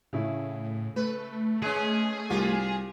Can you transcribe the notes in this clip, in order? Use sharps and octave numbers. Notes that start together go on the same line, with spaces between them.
A2 C#3 E4
A3 B4
G#3 C#4 G#4
C2 F4 G4